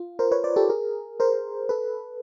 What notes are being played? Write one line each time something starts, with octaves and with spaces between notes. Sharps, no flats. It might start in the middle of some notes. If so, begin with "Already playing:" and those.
Already playing: F4
A#4 C5
B4 C#5
C5 D5
G4 A4
G#4 A#4
A#4 C5
A4 B4